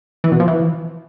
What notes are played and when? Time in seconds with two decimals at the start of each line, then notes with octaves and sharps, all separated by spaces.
0.24 E3
0.32 B2
0.40 F3
0.48 E3